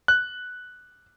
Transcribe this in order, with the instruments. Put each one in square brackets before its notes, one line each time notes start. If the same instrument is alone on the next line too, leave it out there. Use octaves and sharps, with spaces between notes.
[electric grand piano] F#6